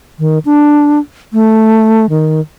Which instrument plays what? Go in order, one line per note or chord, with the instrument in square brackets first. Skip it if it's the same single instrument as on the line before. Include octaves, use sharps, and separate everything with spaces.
[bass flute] D#3
D4
A3
D#3